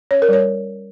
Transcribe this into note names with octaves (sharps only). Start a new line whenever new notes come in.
C#4 C#5
A#4
G3 C#5